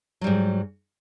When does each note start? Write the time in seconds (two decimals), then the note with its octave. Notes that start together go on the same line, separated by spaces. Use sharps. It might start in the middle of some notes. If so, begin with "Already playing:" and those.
0.21 F#3
0.24 G3
0.27 G#2